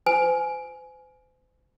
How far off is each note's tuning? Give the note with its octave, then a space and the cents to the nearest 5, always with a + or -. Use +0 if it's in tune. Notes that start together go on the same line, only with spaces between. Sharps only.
C5 -40 G#5 +15